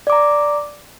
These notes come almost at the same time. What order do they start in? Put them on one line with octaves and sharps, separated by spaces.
D5 D6 A#5